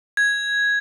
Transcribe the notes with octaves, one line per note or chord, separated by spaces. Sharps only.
G#6